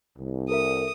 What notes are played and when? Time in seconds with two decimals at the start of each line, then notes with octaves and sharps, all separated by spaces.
0.17 C2
0.50 A4 A#4 E5 D#6